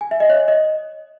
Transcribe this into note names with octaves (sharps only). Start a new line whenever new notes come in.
G#5
E5
D#5
C#5
D#5